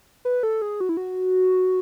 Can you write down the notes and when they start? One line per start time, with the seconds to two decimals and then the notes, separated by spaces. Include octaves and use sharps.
0.25 B4
0.43 A4
0.62 G#4
0.81 F#4
0.89 E4
0.97 F#4